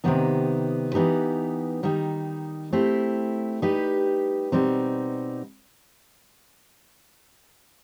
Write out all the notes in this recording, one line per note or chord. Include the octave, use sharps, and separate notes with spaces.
C3 D#3 G3 B3 D#4
E3 B3 D#4 G4 B4
D#3 G3 D#4
A3 C4 E4 G4
G3 D#4 G4 B4
B2 G3 C4 D#4